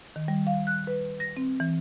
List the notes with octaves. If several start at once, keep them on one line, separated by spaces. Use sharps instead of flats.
D#3
G3
F5
F#6
B4
A#6
C4
E3